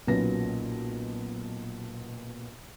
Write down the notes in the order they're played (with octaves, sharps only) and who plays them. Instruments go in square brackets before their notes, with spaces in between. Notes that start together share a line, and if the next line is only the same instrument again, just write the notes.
[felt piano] B1 A#2 F#3 C#4 B4 A#6